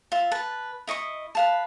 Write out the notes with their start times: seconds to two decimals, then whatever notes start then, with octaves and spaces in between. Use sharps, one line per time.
0.12 F4 E5
0.31 B4 A5
0.87 E4 D#5 C#6 D#6
1.35 B4 F5 A5